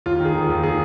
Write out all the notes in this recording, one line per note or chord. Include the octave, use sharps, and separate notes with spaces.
D#2 F4
D#3
G#4
D#3
D#2
D#3 G#4